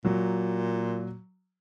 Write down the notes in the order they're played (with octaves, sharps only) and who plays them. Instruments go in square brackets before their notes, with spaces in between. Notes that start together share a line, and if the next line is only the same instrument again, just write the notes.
[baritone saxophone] A#2 [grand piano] F#3